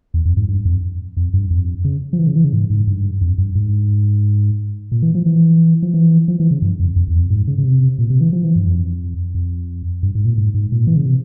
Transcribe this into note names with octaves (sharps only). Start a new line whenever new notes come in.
E2
F2
G#2
G2
F2
F2
G2
F2
C#3
F3
E3
C#3
E3
C#3
G#2
G#2
G2
F2
G2
G#2
A#2
E3
F3
E3
F3
E3
F3
E3
C#3
G2
F2
F2
E2
F2
G#2
C#3
C#3
C3
A#2
C3
E3
F3
E3
G2
F2
F2
G2
G#2
A#2
G#2
G#2
A#2
E3
C#3
C3